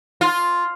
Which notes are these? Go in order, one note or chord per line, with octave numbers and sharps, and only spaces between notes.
F4